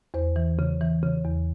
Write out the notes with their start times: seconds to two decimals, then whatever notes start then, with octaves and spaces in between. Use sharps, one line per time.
0.14 E2 C5
0.36 E3
0.59 C#3
0.81 E3
1.03 C#3
1.25 E2